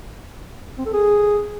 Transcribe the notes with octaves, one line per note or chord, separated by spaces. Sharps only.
C4
A4
G#4